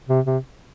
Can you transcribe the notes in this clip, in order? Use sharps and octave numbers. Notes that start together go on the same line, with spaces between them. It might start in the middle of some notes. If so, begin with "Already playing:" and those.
C3
C3